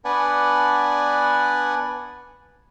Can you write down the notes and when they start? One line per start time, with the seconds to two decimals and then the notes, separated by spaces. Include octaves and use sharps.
0.05 B3 D4 B4 D5 F#5 G#5